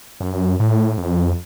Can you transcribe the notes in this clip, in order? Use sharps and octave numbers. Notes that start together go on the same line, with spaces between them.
F#2
A2
F2